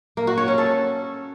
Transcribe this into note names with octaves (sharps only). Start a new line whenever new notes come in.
A#3
F#4
C#5
C#4
A4